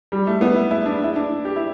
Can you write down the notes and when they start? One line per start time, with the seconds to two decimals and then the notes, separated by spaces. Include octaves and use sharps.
0.12 G3
0.27 A3
0.41 B3
0.56 E4
0.71 E4
0.86 D4
1.04 E4
1.16 D4
1.45 G4
1.56 E4